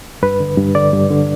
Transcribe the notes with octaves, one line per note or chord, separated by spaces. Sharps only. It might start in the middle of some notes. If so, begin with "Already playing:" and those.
G2 B4
D3
G2
D3 D5
G2
D3